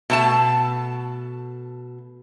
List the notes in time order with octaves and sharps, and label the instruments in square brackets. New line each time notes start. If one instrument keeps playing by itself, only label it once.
[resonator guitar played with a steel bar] B2 A3 A5